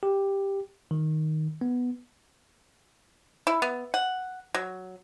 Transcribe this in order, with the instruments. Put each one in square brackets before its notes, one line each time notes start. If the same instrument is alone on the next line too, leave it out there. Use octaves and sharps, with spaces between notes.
[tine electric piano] G4
D#3
B3
[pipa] E4
B3
F#5
F#3